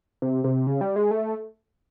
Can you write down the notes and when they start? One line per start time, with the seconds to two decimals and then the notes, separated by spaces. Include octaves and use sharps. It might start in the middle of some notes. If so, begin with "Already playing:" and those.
0.22 C3
0.44 C3
0.67 C#3
0.81 G3
0.96 G#3
1.11 A3